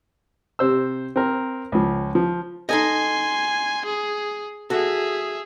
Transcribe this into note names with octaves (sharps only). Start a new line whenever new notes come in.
C3 C5 E6
C4 A#4
C#2 F3
F3
D#4 A4 D#5 G#5 C6
G#4
F#4 G#4 A4 E5